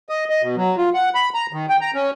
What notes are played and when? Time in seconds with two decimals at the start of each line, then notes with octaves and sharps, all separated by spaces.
0.09 D#5
0.30 D#5
0.42 B2
0.56 F#3
0.78 F4
0.94 F#5
1.15 B5
1.34 A#5
1.53 D#3
1.69 G5
1.81 A#5
1.94 C#4